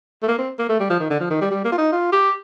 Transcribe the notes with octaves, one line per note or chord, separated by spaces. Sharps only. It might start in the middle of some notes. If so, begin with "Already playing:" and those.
A3
A#3
C4
A#3
A3
G3
F3
D#3
D3
F3
D#3
G3
G3
A#3
F4
D#4
F4
G4